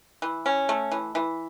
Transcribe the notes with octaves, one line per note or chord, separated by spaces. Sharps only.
E3
C#4
A3
E3
E3